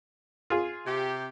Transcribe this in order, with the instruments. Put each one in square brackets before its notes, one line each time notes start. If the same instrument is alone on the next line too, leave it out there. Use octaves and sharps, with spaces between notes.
[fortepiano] F4 G#4
[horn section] C3 G4